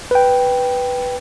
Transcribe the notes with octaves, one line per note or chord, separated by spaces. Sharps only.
B4 G5